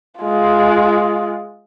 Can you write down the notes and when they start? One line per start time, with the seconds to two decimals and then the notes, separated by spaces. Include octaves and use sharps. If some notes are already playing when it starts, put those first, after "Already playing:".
0.21 G#3 F4